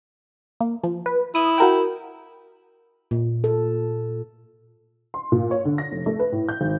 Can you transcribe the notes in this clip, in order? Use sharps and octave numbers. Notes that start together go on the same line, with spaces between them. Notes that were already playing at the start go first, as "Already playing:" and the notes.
A#3
F3
B4
E4 D#6
F#4 A#4 G5
A#2
A4
C6
A#2
C#5
D3
A#6
F1
A3
B4
A2
G6
G#1